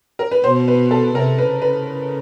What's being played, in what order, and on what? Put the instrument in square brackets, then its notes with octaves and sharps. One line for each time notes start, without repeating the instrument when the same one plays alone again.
[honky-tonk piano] A#4
B4
[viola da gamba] B2 [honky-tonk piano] C5
[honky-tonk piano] B4
A4
[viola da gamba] C3 [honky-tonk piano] A#4
[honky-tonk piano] B4
[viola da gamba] C#3
[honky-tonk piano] B4